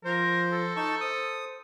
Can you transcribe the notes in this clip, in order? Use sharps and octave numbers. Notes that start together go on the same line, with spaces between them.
F3 A#4 C5
A4
D#4 A5 C#6
C5 D#6